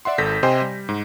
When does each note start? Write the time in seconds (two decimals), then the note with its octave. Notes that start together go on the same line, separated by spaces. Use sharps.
0.05 D5 E5 F#5 C6
0.18 G#1 A4 G6 A#6 B6
0.43 C3 C5 D#5 G5 G#5 C6
0.62 G3
0.89 G#2